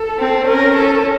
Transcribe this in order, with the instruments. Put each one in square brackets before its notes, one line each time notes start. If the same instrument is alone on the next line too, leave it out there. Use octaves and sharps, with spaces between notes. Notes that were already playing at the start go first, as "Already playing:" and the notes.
Already playing: [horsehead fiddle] A4
[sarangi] C4
[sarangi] C#4 [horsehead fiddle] A#4
[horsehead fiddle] A4